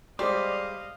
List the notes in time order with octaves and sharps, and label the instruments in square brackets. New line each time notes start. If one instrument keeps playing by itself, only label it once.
[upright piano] G3 G#3 G4 [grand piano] C5 [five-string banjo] D5 [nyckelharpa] D#5 F5